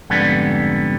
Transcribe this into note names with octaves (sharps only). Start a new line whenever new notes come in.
F2 G#2 D3 G3 B3